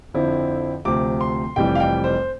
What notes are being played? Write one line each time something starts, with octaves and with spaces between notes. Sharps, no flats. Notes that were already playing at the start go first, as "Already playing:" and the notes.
F2 D3 F3 C4 E4
D2 C3 F3 D6
C6
F1 F2 E3 G3 G5
F5
G5
C5